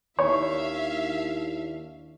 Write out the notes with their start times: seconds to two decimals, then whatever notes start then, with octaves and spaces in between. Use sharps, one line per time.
0.19 D#2 D4 E4 C#5 E5 F5